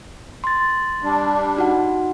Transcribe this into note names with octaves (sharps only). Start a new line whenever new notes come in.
C6 A6
G3 D4
D#4 F#4 F#5